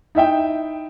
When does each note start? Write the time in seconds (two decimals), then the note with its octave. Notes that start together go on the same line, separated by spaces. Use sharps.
0.15 D#4 E4 E5 G5